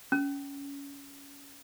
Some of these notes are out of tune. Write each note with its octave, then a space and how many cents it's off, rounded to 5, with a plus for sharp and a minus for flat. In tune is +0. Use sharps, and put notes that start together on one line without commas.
C#4 +20